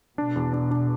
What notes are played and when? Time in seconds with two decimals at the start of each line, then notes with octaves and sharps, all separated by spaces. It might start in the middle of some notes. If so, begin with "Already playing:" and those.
0.18 B2 D4
0.36 E2
0.53 D4
0.71 D4